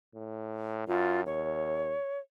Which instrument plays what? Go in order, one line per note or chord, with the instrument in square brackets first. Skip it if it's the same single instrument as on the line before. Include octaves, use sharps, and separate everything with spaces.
[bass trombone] A2
[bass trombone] F#2 [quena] F4
[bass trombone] D#2 [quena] C#5